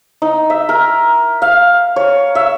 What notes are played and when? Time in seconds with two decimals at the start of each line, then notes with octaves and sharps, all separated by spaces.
0.22 D#4
0.50 E5
0.69 A#4
1.42 F5
1.96 C#5
2.35 E5